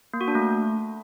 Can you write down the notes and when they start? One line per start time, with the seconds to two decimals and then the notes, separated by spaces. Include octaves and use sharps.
0.14 A#3
0.21 F#4
0.28 D4
0.35 A3